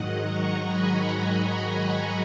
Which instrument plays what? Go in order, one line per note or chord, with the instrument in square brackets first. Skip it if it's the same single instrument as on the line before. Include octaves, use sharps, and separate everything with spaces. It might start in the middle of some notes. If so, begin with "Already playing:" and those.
Already playing: [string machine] G#2 D#3 F#3 D#5 F#5
A#5 C#6
G#5 B5
G#5 B5
G#5 B5